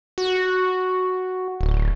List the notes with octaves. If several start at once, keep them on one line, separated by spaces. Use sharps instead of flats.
F#4
D1